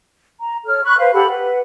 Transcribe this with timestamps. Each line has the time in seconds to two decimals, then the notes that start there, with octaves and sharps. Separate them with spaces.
0.39 A#5
0.65 A4 C#5 F6
0.84 B5 C#6 F#6
0.98 B4 C5 F5
1.14 G4 A4 F#5 B5
1.28 B4 F#5